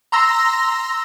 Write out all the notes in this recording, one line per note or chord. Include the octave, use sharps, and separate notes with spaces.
A#5 C6 E6 A#6